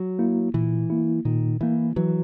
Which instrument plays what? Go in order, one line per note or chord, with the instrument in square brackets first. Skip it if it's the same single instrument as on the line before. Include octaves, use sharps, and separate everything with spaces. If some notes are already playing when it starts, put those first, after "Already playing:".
Already playing: [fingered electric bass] F#3
[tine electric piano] A#3 E4
[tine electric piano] A#2 [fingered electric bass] E3
[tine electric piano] A#3 E4
[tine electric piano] A#2 [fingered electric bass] D#3
[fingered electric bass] E3 [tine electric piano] A#3 E4
[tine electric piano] E3 [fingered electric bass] F#3